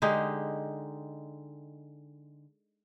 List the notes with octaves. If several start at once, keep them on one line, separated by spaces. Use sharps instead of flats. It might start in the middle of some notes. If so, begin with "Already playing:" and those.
D3 G#3 D#4 G4